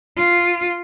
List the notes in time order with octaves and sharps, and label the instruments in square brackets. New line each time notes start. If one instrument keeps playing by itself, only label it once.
[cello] F4